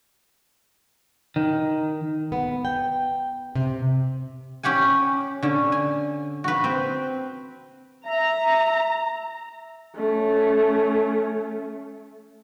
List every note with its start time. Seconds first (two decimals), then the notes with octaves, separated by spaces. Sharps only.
1.36 D#3
2.32 B3
2.65 G5
3.55 C3
4.63 C#4 G4 F#5 G#5
5.43 D3 C#4
5.72 G#5
6.44 F#4 B4
6.64 C4
8.06 E5 A#5
9.95 A3 C#4